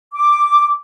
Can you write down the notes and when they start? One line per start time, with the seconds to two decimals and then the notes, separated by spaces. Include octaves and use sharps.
0.12 D6